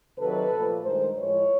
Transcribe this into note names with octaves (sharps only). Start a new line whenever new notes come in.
C3 D#3 F#3 A4 B4
A#2 F3 A3
G2 D#3 G#3 A#4 C5
A2 F3 G#3 B4 C#5